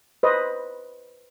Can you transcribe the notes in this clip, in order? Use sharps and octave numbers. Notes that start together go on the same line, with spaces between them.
B4 C5 D#5